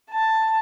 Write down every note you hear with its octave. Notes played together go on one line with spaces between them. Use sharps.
A5